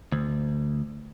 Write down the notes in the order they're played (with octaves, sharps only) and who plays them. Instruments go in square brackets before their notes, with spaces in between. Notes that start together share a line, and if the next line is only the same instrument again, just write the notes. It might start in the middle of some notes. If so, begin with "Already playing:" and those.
[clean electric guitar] D2